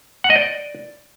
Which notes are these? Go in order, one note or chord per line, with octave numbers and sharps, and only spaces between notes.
F#5
D#5
D5